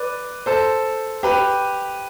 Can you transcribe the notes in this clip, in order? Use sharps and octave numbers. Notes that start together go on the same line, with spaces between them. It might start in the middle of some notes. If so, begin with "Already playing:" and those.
Already playing: B4 D5
A4 C5
G4 B4